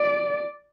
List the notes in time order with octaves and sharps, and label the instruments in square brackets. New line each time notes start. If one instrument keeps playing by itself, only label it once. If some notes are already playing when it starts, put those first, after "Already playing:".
Already playing: [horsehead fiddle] D5